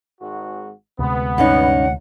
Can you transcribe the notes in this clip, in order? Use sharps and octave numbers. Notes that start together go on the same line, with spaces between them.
G#1 G#2 F#4
D2 C3 G#3 B3
G2 C#4 D#4 F#5